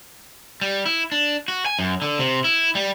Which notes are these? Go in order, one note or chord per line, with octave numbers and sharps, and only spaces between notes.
G3
E4
D4
F#4
G#5
F#2
D3
C3
E4
G3